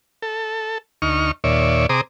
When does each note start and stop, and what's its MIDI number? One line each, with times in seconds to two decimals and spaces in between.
0.22 0.78 69
1.02 1.31 38
1.02 1.31 63
1.02 1.31 85
1.02 1.31 89
1.44 1.86 39
1.44 1.86 46
1.44 1.86 73
1.44 1.86 74
1.44 1.86 76
1.89 2.01 48
1.89 2.01 68
1.89 2.01 72
1.89 2.01 82
1.89 2.01 86
1.89 2.01 87